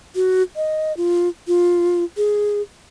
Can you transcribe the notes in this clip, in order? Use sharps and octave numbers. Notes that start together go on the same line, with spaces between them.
F#4
D#5
F4
F4
G#4